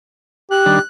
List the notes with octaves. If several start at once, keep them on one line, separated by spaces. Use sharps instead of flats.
G4 F#6
D#3 G3 D4